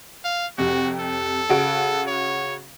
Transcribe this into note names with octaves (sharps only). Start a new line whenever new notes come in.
F5
F2 C3 F#4
A4
C#3 F#4 D7
C#5